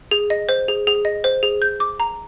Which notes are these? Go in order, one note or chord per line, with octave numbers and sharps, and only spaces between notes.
G#4
D#5
C5
G#4
G#4
D#5
C5
G#4
G6
D6
A#5